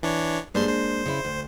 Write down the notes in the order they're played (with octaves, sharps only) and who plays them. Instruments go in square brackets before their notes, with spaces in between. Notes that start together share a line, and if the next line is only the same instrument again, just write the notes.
[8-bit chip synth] E3 D4 C#5
[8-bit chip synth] G2 C5 C6 [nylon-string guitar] G#3 A#3 D4
[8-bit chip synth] C5
[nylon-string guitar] C#3 E4
D2